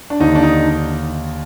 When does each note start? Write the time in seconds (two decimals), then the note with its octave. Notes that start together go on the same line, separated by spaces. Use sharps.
0.10 D4
0.20 D#2 D3 D#4
0.35 D4
0.43 D#4